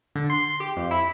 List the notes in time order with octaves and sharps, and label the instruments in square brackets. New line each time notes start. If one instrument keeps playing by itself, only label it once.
[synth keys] D3
C6
G4
F2
E4